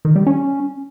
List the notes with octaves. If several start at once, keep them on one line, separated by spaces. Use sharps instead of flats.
D#3
G3
C#4